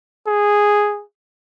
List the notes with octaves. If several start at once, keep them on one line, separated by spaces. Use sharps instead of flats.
G#4